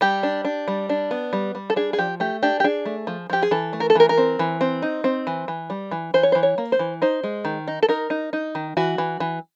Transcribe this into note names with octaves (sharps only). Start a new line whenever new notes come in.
G3 G4
D4
D4
G3
D4
B3
G3
G3
A4
D4 G#4
G#4
F3 G4
A3 G4
D4 G4
G4
D4 G#4
A3
F3
F3 G4
G#4
E3 A4
A3
A#4
A4
E3 A#4
A#4
C4
E3
C4
D#4
C4
E3
E3
G3
E3
E3 C5
C#5
C5
E3
C#5
A#3
C5
E3
D#4 C5
G#3
D#3
D#4
A4
D#4 A#4
D#4
D#4
D#3
E3 F#4
E3
E3